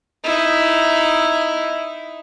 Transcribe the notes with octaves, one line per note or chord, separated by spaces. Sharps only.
D#4 E4